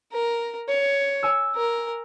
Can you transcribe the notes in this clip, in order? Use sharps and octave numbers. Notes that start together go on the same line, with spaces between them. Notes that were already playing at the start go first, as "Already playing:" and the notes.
A#4
C#5
G#5 E6
A#4